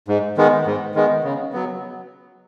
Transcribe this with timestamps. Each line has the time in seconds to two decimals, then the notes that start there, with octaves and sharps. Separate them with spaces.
0.08 G#2
0.37 D#3 G#3 B3
0.66 G#2
0.95 D#3 G#3 B3
1.24 C#3
1.53 F#3 B3